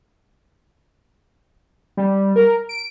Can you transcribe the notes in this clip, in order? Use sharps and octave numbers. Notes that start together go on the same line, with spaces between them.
G3
A#4
D7